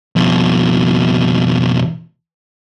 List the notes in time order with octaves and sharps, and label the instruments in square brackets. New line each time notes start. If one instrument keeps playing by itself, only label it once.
[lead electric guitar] F2 B2